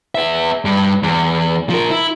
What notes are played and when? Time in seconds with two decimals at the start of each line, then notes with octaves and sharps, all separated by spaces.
0.15 B3 E5
0.65 G2
1.03 E2
1.70 F3 A#4
1.90 E4